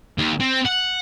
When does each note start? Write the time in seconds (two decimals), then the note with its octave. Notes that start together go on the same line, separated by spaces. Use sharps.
0.18 D#2
0.40 C4
0.65 F#5